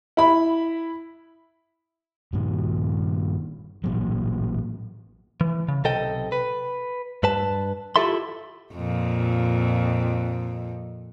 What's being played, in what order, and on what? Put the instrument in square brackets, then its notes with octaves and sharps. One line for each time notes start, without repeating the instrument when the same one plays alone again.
[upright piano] E4 B5
[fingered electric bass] G2 A#2 D#3
A1 A#2 F#3
[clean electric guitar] E3
C#3
B1 C3 A4 D#5 G5
B4
G2 B4 A5
E4 F4 G4 A4 E5 C6
[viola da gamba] F2 A#2